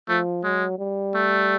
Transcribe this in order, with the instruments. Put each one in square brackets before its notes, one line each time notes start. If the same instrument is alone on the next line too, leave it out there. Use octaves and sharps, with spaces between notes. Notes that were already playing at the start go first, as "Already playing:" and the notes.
[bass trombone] F3 [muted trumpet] A3
[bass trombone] F#3 [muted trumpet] G#3
[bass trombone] G3
[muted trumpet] A3